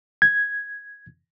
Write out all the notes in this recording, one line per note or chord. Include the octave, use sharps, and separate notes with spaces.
G#6